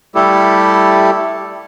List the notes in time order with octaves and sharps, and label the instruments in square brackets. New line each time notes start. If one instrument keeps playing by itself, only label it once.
[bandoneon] G3 A3 E4 G4 A4